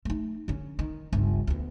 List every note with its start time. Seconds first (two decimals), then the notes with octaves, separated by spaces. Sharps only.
0.05 A3 D#4
0.48 D3 C#4
0.79 D#3
1.12 G1 C#2
1.47 D2 B3